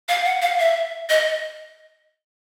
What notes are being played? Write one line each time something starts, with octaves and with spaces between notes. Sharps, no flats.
F5
F#5
F5
E5
D#5